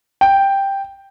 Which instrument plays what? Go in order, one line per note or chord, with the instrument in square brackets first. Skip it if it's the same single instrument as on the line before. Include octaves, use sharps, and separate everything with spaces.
[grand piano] G5